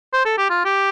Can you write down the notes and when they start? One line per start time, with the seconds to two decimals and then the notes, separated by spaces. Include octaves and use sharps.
0.14 C5
0.26 A4
0.38 G4
0.50 F4
0.65 G4